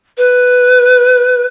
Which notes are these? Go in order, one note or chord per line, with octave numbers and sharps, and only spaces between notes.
B4